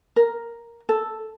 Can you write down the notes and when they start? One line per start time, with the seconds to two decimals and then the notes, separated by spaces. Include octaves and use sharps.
0.16 A#4
0.89 A4